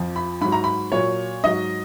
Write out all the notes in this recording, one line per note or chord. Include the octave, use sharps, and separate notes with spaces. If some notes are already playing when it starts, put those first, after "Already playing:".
Already playing: F2 F3
B5
G#2 F#3 B5
A#5
B5
A#2 F#3 C#5
G#2 F#3 D#5